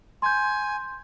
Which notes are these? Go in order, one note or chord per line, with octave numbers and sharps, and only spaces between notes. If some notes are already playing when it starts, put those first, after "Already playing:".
G#5 C6 G6